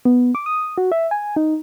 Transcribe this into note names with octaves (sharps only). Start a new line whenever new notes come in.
B3
D6
D#6
F#4
E5
G#5
D#4